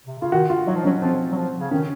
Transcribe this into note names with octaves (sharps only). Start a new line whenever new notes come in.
C3
C#3 F4
D#3 F#4
F4
F#3 D#4
F3
F#3 C#4
F3 C4
F#3
F3
C#3
D#3 C#4